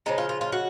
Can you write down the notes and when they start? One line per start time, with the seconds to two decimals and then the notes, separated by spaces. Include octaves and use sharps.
0.06 C#3 F3 G#3 D#4
0.18 F4
0.29 F4
0.41 F4
0.52 F#4